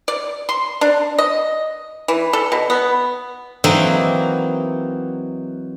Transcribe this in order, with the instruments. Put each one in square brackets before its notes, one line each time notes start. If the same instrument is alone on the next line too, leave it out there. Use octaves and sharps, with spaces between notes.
[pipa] D5
C6
D4
D#5
E3
A4
B2
B3
[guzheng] E3 F#3 A#3 C4 D#4 E4